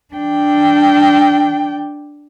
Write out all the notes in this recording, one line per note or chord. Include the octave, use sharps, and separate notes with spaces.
D4 G5